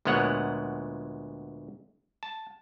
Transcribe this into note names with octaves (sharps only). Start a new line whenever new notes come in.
D2 A#2 G#3 B3 C#5 F#5
A5